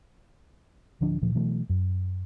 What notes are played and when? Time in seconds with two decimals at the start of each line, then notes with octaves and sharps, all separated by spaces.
1.01 D1 D3 F3 D4
1.22 D2 A#2 F3
1.35 B2 E3 F#3 A3
1.69 F#2